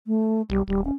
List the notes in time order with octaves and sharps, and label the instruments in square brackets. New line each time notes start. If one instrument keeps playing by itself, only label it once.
[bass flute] A3
[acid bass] B1 [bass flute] G3
[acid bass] D#1 [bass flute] G3
[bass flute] C#4